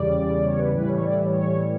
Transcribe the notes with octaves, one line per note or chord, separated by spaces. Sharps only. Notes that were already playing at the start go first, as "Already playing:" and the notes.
Already playing: E2 C#3 G3 D5
C#5
B4
A2 E3 G3 B4
C#5
D5
E5
C#5